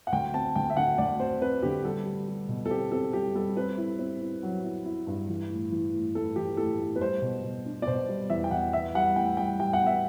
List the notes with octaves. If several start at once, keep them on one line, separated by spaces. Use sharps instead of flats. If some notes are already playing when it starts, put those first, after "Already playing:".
F#5
D2 G5
C4 A5
D2 G5
E5
D3 F#5
D2 D5
C4 C5
C4 B4
D3 G4
G3 A4
G3
G3
B2
A4
C4 G4
C4 A4
G3 G4
G3 A4
C4 B4
E4
C4
E4
F#3
E4
E4
G2
E3
A2
E3
A2
A2 A4
E3 G4
A2 A4
A3
B4
G3 C5
B2
B2
D4
D5
B2 C5
G3
E2 E5
G5
E2 F#5
B3 E5
G3 F#5
A2 G5
G3 G5
G3 G5
F#5
B3
E5